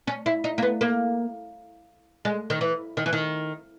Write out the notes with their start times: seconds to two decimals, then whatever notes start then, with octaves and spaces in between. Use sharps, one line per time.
0.07 C#4
0.26 E4
0.44 D#4
0.58 A#3
0.62 B3
0.81 A#3
2.25 G#3
2.50 D#3
2.61 E3
2.97 D#3
3.06 E3
3.13 D#3